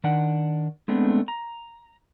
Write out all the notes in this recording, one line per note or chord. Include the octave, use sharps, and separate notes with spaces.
D#3 D4 D5 F#5
G#3 A3 B3 C4 D4
A#5